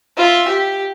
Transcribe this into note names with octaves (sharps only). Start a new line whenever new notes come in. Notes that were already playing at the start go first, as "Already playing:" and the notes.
F4 E5
G4